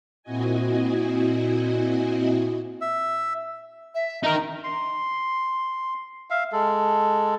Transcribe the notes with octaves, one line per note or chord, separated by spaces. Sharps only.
A#2 C4 E4 F#4 D#5 G#5
E5
E5
D#4 A#4 A#5
C6
E5 F5
G#3 A4